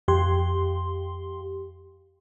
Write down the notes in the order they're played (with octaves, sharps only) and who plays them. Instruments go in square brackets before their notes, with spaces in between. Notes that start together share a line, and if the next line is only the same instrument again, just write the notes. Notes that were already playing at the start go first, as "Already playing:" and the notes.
[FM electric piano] F2 G4 C6